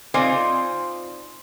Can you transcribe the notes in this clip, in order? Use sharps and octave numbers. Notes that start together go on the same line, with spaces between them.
C4 D#4 F4 C5 D5 G#5